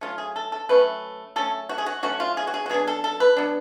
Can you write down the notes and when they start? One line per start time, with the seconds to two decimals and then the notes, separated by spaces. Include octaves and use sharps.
0.01 F#3 A3 C#4 F4
0.18 G#4
0.36 A4
0.52 A4
0.69 F#3 A3 C#4 B4
1.36 F#3 A3 C#4 A4
1.69 F#4
1.78 G#4
1.86 F#4
2.03 F#3 A3 C#4 F#4
2.20 F4
2.37 G#4
2.47 F#4
2.54 G#4
2.66 F#4
2.69 F#3 B3 D4 G#4
2.87 A4
3.04 A4
3.20 B4
3.37 F#3 B3 D4